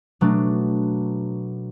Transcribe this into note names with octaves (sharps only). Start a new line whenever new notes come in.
B2 F#3 A3 D4